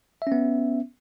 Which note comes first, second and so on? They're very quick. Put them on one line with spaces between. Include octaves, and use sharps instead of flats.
E5 C#4 B3